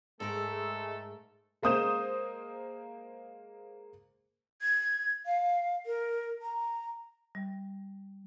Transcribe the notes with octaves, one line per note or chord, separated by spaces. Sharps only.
G#2 G#3 A3 A4 A#4
G#3 A#3 C5 D#6 G6 E7
G#6
F5
A#4
A#5
G3